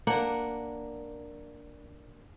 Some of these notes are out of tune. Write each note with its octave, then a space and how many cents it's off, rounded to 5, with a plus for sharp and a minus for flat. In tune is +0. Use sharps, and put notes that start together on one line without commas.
A#3 +0 D4 +0 F#5 +0